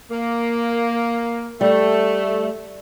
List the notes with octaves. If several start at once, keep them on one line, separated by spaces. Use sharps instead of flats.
A#3
G3 A3